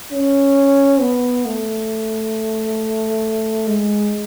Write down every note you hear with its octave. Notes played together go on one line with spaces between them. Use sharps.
C#4
B3
A3
G#3